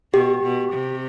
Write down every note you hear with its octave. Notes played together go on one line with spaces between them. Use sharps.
B2 G4
B2
C3